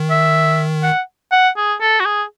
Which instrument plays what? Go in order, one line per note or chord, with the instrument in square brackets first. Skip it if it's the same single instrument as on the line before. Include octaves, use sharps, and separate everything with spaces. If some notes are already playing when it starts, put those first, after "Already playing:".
Already playing: [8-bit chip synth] D#3
[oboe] E5
F#5
F#5
G#4
A4
F#4
G#4